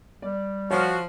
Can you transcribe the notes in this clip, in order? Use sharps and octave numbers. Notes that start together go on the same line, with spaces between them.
G3 D5
F3 F#4 C#5 F6